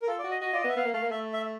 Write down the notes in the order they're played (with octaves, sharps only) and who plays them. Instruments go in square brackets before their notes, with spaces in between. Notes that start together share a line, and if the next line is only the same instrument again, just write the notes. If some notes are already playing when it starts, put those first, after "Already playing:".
[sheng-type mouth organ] A#4
[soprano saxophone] F4 [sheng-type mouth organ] A4
[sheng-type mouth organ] D5
[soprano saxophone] F#4
[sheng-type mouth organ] D#5
[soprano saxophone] F#4 [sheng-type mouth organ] D#5
[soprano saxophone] F4 [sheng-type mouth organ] D5
[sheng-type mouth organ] D#5
[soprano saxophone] B3
[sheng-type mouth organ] E5
[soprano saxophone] B3 [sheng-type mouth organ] F5
[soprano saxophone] A#3
[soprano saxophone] A3 [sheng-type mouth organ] F5
[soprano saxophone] A#3
[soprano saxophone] A3 [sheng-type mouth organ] E5
[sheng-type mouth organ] E5